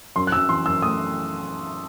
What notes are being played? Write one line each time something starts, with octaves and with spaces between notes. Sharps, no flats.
F#2 C6
F#6
F#2 E6
E3 C6
F#2 E6
A3 D#6